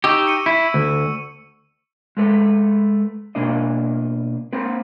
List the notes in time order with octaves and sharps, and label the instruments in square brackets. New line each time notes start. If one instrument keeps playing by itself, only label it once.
[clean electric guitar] D#4 G4 [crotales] C#6 E6
[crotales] C#6 C#7 D#7
[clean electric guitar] E4
D2
[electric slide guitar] G#3 A3 B4
B2 A#3 D4 D#5
A#3 C4 B4